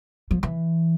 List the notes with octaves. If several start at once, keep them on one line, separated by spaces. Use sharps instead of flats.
F3
E3